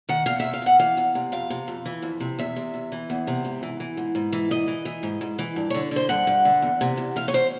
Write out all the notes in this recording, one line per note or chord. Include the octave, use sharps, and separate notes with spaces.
D#3 F#5
E2 F5
C3 E5
F5
E2 F#5
E3 F5
E2
C3
F2 F5
C3
F2
E3
F2
C3
E2 E5
C3
E2
E3
E2
C3
G#2
E3
E3
G#2
G#2
E3
G#2 D#5
E3
E3
G#2
G#2
E3
G2
D3 C#5
D3 C5
G2 F#5
G2
D3
E2
C3
E2
E3 F5
C#5
E2 C5